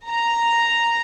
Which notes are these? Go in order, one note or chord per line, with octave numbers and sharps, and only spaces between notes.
A#5